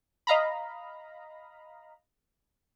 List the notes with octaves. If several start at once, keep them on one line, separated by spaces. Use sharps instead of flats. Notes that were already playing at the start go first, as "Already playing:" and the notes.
D#5 F5 A#5 B5